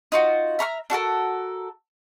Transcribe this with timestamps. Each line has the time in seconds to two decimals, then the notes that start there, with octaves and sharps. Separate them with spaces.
0.12 D#4 F4 F#4
0.59 E5 A#5 C6 F6
0.90 D4 F#4 A4 A#4